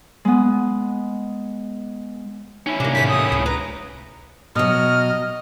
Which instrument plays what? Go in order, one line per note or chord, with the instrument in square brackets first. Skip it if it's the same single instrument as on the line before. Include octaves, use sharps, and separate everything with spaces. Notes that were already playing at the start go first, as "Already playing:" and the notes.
[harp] G#3 B3
[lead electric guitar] C#4 E4 [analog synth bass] D#4
[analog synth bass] C3 [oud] A#3 D4
[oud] E2 A2 D#3 [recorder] B6
[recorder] D#6
[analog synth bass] C#2 [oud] C#3
[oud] B4 [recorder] A#5
[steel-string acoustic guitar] B2 F#3 [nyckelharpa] D#5 [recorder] F6